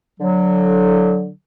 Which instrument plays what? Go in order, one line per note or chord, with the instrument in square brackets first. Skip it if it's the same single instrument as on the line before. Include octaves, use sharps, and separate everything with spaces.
[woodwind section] D3 F#3